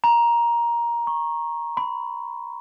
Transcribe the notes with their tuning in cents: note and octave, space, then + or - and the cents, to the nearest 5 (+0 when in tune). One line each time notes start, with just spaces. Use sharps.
A#5 +15
C#6 -20
B5 +25